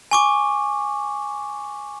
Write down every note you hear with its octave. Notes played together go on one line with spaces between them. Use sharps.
G#5 C#6 D6